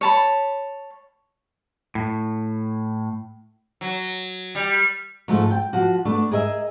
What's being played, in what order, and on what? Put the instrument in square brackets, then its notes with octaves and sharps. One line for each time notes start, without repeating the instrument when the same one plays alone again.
[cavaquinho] C#5 A5 B5
[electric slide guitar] A2
[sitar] F#3
G3
[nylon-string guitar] G#2 F3 A3
G5
F3 F#4
A3 B3 D4
G#4 A#4 D#5 E5